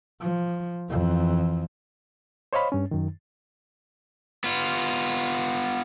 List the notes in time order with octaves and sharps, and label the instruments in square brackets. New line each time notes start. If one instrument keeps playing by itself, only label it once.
[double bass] F3
F2 E3
[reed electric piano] C5 C#5 D#5 F5 B5
G2 C#4
F#2 D#3
[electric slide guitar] B3 F4